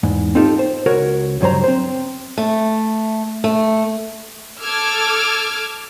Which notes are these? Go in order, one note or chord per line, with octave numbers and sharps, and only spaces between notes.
E2 G#2
C4 D#4 F4 G4 A4
C5
C#2 F#4 A#4 C#5
C#2 G2 F#3 C5 A#5
C4 C5
A3
A3
A4 D6 E6 F6 G#6